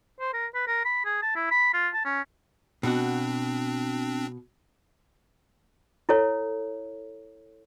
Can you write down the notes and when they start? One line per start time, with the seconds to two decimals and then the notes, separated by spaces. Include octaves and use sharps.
0.20 C5
0.33 A#4
0.55 B4
0.67 A#4
0.85 B5
1.05 G#4
1.22 A5
1.36 E4
1.51 B5
1.73 F4
1.94 A5
2.05 C#4
2.83 B2 C4 D4 F#4
6.09 E4 A4 C#5